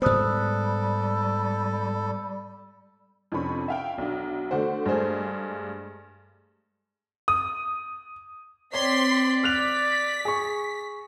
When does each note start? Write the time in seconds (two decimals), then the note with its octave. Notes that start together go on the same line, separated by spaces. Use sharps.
0.02 G#2 G3 B3 A4 C5 D#6 F#6
3.32 F2 C3 C#4 D4 B5 C#6
3.68 E5 F5 G5
3.98 B1 D4
4.51 D3 A3 D4 F#4 C5
4.86 G2 G#3 A3 G#4 C5
7.28 D#6
8.73 C4 C#5 D5 C6 B6
9.43 F6 F#6 B6 F7
10.25 G#4 C#6